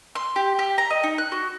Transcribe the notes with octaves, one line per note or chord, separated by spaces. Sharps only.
C6
G4
G4
A#5
D#5
D#4
F#6
F#4